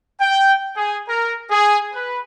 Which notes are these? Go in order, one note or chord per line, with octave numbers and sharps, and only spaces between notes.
G5
G#4
A#4
G#4
B4